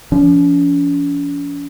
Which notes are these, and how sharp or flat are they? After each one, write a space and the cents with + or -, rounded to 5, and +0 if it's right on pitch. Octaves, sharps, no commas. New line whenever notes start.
F3 -25 C#4 +45